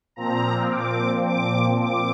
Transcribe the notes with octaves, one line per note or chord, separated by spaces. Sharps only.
A#2 F3 C4 A#5
D6
D6
D6